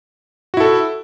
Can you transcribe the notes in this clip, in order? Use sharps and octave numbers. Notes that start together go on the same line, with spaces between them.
E4 F#4 A4